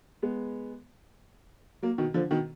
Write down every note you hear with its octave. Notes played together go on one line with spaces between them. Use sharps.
G#3 B3
F#3 A#3
B2 D#3
D3 F3
B2 D#3